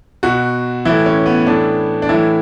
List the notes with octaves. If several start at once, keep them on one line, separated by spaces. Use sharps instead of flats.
B2 F#4
A2 E3 E4
C#4
B3
A2 E3 D4
D4
A2 E3 E4